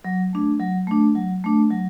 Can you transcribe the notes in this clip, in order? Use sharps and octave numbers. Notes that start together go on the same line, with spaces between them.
F#3
A3 D4
F#3
A3 D4
F#3
A3 D4
F#3